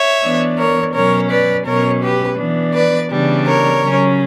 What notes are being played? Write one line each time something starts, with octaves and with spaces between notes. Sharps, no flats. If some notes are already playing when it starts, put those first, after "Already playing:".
Already playing: C#5 E5
E3 B3 D4
A#4 C#5
B2 F#3 C#4 A#4 C#5
B4 D5
B2 F#3 C#4 A#4 C#5
G4 B4
E3 B3 D4
B4 D5
C#3 E3 G3 B3 D4
A#4 C#5
C#3 F#3 C#4